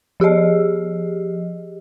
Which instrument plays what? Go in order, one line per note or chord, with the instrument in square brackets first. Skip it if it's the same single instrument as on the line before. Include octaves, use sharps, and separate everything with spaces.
[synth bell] F3 G4 G#4 D#5